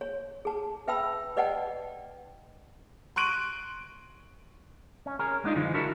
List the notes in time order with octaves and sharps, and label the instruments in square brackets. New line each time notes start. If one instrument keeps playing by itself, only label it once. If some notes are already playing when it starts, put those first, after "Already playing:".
[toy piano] C#5
G#4 A5
B4 E5 G5 A5 B5 E6
B4 D5 D#5 F#5 G5 A5
[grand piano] C6 C#6 F#6 D7 D#7 F#7
[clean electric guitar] C#4
C#4 G#4 A#4
G#3 B3 D4 D#4 F4
F#2 D3 E3 F3 G#3
D4 E4 F#4 A4 A#4 E5